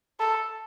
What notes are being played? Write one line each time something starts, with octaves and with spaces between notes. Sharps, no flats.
A4